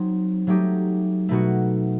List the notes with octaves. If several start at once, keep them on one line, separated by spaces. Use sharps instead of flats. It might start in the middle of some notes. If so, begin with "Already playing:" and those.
Already playing: F#3 C4 D#4
F#3 A3 D#4 G4
B2 A3 D#4 F#4